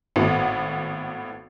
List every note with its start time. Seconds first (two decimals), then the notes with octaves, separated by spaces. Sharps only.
0.16 G#1 A2 B3